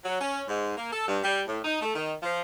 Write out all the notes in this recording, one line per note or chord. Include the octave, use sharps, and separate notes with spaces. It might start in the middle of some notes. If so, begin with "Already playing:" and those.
F#3
C#4
G#2
A#3
A4
G2
G3
A2
D#4
A3
D#3
F3